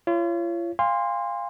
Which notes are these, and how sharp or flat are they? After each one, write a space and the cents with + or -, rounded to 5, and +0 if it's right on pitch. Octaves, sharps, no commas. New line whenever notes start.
F4 -40 C#5 +5
F5 +0 G#5 -45 C6 +0